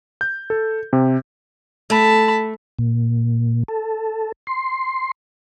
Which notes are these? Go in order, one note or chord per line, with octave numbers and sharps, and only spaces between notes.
G6
A4
C3
A3 A5 B5
A#2
A4
C6